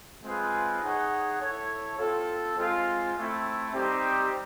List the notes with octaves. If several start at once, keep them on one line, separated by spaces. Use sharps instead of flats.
G#3 C4 F4 G#4 B4
D#4 G#4 C#5 F#5
E4 A4 C#5
C4 F4 A4
G#3 C4 F4
A3 C4 E4
G3 C4 D#4 G4